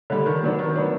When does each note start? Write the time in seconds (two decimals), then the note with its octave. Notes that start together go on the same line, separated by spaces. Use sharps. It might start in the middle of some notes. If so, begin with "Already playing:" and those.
0.10 D3 G3
0.26 D#3
0.43 F#3 B3 D4
0.59 D#3
0.76 F#3 B3 D4